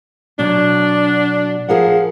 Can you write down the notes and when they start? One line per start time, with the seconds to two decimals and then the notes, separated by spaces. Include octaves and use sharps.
0.39 B2 F#3 D4
1.69 F3 G#4 A#4 F#5